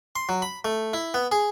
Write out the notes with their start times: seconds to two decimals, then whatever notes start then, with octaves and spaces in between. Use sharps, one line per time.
0.16 C6
0.29 F#3
0.42 B5
0.65 A3
0.93 E4
1.14 B3
1.32 G#4